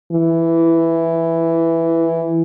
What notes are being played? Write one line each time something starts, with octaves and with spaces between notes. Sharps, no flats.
E3